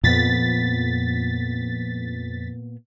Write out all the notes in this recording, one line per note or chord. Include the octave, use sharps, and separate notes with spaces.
F2 A#2 B3 A6 B6